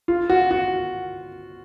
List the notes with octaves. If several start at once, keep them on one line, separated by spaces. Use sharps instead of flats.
F4
F#4
F#4